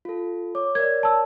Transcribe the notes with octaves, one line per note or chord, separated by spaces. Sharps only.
F4 A4
C#5 D6
A#4 C#5 D5 G#6
A5 E6